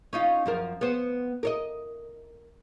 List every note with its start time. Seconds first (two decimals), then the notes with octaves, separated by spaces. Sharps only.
0.13 C#4 D#4 F4
0.46 F#2 F3 A#4
0.81 B3 C5
1.43 A#4 C#5 D#5